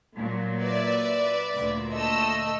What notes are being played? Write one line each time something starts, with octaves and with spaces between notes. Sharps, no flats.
A#2 F#3
B4 D5 E5
D2 A#2
A3 D#5 E6